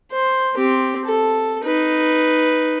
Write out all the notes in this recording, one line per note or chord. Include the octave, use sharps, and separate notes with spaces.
C5
C4 G4
A4
D#4 B4